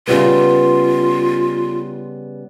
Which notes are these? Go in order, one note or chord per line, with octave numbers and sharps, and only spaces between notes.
C#3 G3 B3 F4